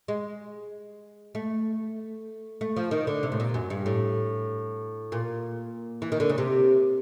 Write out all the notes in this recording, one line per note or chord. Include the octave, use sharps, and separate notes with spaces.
G#3
A3
A3
F3
D#3
D3
C3
A2
A#2
F#2
G2
A2
A#2
E3
D#3
D3
C#3
C3